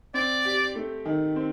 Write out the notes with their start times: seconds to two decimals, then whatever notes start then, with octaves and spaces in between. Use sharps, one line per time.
0.14 C4 D5
0.45 G4
0.76 A3
1.05 D#3
1.36 C4